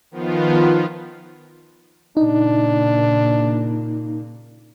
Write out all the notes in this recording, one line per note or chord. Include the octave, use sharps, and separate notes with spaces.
D#3 F3 B3 F4
A#2 C#3 A#3 D4 D#4